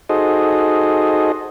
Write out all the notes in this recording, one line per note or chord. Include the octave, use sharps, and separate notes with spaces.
D#4 F#4 G#4 A4 C5 D#5